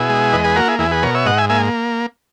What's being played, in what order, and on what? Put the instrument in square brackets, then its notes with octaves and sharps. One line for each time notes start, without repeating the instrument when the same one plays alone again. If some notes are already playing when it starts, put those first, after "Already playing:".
Already playing: [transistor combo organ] B2 E4 G#4
G#3
E2 B4 D#5
G#4 B4
A#3 F#4 A#4
E4 G#4
E2 E4 G#4
G#4 B4
B2 A#4 C#5
C#5 E5
G#2 D#5 F#5
E5 G#5
A#3 E5 G#5